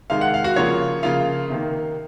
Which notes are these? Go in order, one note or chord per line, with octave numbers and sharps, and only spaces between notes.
C3 D#3 G#3 F5
F#5
F5
F#4
C#3 F3 A#3 F4 C#5
C#3 F3 A#3 F4 F5
C3 D#3 A#3